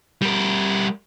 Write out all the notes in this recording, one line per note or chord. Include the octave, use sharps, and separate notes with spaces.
G3 A#4